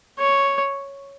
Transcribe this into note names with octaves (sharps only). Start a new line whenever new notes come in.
C#5